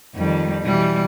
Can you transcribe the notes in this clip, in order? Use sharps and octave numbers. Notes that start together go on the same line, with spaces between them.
F2 D#3 G3
B2 E3 G3